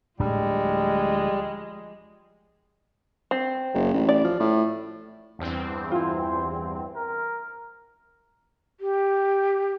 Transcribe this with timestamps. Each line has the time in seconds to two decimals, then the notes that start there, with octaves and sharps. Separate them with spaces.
0.19 D1 A2 F3 G3 G#3 D4
3.31 C4
3.74 F#1
3.94 A1
4.09 D5
4.24 F3
4.40 A2
5.39 E2 G2 C4
5.91 E4 F4 C5
6.96 A#4
8.80 G4